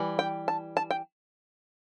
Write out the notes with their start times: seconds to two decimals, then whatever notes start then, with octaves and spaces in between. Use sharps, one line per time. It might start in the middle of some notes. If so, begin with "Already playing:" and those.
Already playing: E3 G3
0.19 G5
0.48 A5
0.77 A5
0.91 G5